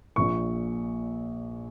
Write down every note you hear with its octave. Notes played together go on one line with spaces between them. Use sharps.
A#1 A#2 F3 C#6